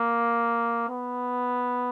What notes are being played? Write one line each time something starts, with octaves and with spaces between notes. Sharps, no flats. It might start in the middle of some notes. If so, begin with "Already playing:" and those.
Already playing: A#3
B3